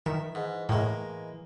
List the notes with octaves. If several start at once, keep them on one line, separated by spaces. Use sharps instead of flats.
D#3 E3 E5
G#2
A2 G#3 A#3